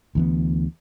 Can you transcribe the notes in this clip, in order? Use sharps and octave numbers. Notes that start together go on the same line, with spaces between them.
D2 E3 B3